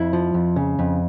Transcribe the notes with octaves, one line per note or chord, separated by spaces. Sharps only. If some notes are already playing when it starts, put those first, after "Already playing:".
Already playing: F2 E4
F3
F2
C#3
F2